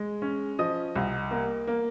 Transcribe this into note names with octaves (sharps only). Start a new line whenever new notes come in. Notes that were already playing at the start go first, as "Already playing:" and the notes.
Already playing: G#3
C#4
F3 D#5 D#6
C2
A#3
A#3